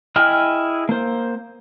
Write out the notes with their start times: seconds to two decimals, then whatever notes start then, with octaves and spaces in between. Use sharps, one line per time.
0.16 E4 G#4 D#5 G5 F6
0.89 A#3 C5